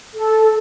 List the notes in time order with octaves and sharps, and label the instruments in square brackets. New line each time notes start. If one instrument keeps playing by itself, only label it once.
[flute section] A4